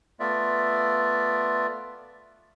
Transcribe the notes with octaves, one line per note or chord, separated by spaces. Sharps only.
A3 B3 F4 D5 E5